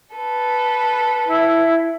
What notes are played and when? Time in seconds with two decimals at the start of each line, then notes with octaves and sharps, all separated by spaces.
0.14 A4 B4
1.29 E4